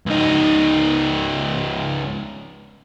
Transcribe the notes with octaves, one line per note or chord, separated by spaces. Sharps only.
C#2 D#4